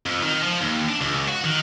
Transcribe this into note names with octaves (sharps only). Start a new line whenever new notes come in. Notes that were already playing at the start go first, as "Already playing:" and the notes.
F2
D#3
F3
D#2
D4
C#2
F#4
D#3